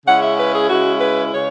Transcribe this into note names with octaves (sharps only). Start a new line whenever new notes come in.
C#3 G#3 C#4 E4 F#5
E5
B4
G#4
C#3 G#3 C#4 E4 F#4
B4
C#3 G#3 C#5